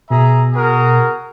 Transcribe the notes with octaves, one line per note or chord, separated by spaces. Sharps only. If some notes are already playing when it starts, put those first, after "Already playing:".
B2 G#4 E5 A#5
F#4 G#4 A#4